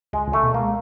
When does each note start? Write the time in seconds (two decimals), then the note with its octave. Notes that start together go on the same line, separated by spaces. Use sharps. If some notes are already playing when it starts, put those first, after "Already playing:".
0.13 C#2 G#3
0.28 C#2
0.33 A3
0.44 B2
0.54 G#3 A#3